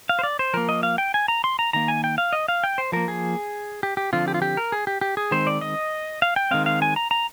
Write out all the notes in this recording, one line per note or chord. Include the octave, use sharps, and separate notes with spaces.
F5
C5
D5
C5
F3 A#3 A#4
D#5
F5
G5
G#5
A#5
C6
A#5
D#3 A#3 A#5
G#5
G5
F5
D#5
F5
G5
C5
F3 A#3 A#4
G#4
G4
G4
D3 F3 C4 F4
G4
F4
G4
A#4
G#4
G4
G4
G#4
D#3 G#3 C4 C5
D5
D#5
F5
G5
D#3 G#3 C4 F5
F5
G#5
A#5
A#5